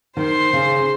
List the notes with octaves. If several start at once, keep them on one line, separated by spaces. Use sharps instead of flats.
D#3 C5 C6
C#3